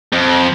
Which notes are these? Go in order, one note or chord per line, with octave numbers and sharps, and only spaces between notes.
F2